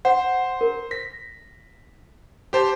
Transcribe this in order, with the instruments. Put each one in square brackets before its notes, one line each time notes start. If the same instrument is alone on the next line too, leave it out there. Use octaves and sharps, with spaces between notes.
[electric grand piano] C5 [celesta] F#5
[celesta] A#4
[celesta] A#6 [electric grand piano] B6
[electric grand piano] G4 C5 A5